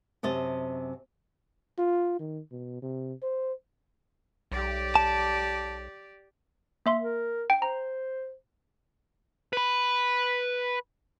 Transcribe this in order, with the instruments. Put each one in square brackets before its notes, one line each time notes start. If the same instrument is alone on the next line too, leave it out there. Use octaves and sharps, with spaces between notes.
[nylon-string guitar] F#2 C3 D#5 A5
[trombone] F4
D#3
B2
C3
C5
[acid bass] B1 [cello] G4 D5
[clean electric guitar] A5
[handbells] A#3 E5 C6
[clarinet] A#4
[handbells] G5
[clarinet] C5 [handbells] A#5
[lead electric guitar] B4 B5